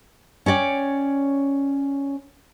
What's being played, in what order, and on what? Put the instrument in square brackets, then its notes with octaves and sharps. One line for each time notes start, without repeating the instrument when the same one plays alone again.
[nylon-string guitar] C#4 C#5 D5 G5